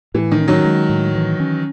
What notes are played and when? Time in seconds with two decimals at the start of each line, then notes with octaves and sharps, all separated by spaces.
0.14 A2 E3
0.32 D#3
0.40 C#4
0.48 D#3 F#3
0.65 G#3
0.90 A2
1.15 E3
1.40 C#4